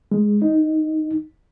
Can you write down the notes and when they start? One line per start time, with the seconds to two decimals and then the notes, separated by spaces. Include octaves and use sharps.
0.12 G#3
0.42 D#4